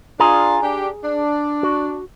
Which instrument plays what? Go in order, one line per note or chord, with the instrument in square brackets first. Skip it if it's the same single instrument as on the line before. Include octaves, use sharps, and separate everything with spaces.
[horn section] D4 F4 [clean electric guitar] G#4 G#5 A#5
[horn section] D4 G4
D4
[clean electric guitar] F#4